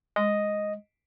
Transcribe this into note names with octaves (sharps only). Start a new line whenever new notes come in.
G#3 D#5